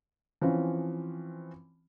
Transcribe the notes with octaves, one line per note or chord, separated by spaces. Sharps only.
E3 F3 C4 C#4